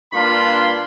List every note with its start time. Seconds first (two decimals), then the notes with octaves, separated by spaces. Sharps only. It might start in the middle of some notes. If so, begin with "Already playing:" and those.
0.13 G2 A#3 D4 F4 B5 C6